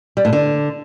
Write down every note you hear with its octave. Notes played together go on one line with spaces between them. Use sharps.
G3
A2
D3